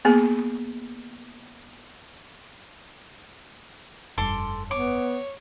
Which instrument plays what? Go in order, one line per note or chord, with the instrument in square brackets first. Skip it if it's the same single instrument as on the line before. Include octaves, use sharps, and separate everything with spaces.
[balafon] A#3 B3 G#4
[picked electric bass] F1 G2 [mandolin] A4 C6 D6
[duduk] B3 [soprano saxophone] C#5 [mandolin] D6